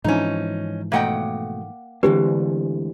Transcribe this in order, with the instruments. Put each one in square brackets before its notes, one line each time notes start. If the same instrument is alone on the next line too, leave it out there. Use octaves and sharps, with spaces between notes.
[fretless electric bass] G#2 E3 F3 [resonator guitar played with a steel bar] C#4 D#4
[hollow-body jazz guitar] B2 A3 D#5 [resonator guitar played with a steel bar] A#3 F#5 G5
[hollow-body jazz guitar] D2 E3 G#3 [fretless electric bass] D3 C4 D4 [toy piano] G4 B4